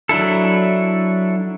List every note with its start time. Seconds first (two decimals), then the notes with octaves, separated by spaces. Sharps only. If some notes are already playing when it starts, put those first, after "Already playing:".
0.09 F#3 D4 E4 A4